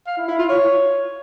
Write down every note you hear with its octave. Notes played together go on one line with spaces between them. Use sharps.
F5
E4
E4
F4
C#5